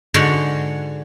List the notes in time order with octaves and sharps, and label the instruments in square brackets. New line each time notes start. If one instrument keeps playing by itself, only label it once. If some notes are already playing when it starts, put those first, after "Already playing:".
[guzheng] G#2 D3 F#4 C#5 D5 C6